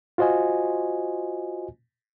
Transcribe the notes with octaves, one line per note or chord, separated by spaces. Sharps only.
F4 F#4 C5 D#5 G#5